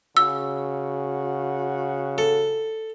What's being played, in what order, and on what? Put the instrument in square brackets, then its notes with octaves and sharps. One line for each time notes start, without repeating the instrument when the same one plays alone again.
[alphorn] C#3 [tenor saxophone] F#4 [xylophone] E6
[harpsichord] A4